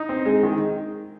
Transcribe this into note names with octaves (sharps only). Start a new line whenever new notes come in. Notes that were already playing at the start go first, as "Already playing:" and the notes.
Already playing: D#4
C4
G#3
D#3